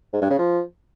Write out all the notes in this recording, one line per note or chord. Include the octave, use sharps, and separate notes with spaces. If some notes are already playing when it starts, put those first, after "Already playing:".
G#2
G2
C#3
F3